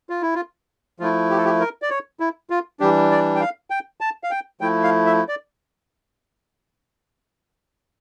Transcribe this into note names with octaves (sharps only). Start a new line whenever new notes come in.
F4
E4
F4
F3 A3 E4 F4
G4
A4
G4
A#4
D5
C#5
E4
F4
E3 G3 D4 G4
D5
G5
F5
G5
A5
F5
G5
F3 A3 E4 G5
F5
E5
D5